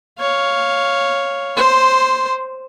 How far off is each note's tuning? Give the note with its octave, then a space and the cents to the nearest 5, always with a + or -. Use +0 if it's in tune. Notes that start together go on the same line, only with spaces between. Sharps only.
C#5 +0 F5 +0
C5 +0 C6 -15